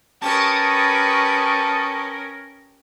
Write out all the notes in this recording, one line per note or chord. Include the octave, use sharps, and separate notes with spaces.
C#4 G4 A#4 B4 A5 C#6 D#6